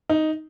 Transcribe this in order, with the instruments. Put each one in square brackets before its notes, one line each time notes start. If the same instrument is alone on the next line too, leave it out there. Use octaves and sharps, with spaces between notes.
[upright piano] D#4